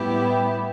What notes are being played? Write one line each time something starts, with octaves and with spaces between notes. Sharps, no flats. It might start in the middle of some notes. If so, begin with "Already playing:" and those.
Already playing: A2 G3 B3 E4 G4 G5